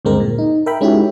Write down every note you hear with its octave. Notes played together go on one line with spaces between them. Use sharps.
D2 G2 G#3 C4 A#4
A#2
D#4
A#4 E5 G5 B5
G#3 C#4 D#4 E4 F#4 G4